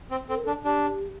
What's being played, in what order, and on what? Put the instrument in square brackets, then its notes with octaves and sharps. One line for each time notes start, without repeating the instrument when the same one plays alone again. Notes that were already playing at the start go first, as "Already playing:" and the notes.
[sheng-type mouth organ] C4
[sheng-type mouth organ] C4 [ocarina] A4
[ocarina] A#4
A4
[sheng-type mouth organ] D4
[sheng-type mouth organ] D4 [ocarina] G4